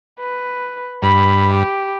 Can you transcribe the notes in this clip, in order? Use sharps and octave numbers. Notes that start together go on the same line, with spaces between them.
B4
G2 B5
G4